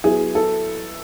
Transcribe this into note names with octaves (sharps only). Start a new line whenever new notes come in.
F#3 B3 E4 G#4
A4